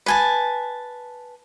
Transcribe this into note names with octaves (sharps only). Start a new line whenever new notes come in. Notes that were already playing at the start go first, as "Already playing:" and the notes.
B4 G#5 A5